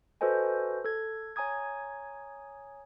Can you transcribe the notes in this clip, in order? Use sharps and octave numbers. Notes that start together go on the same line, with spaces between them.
F#4 A4 B4 C5 D#5 G#5
A4 G#6
C#5 G#5 A#5 D#6 G#6